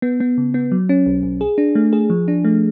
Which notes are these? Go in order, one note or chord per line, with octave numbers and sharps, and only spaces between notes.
B3
B3
C#3
B3
F#3
C#4
B1
B1
G#4
D4
A3
G#4
F3
D4
A3